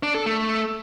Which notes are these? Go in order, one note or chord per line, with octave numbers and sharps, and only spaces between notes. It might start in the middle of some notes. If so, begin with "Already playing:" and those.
D4
A4
A3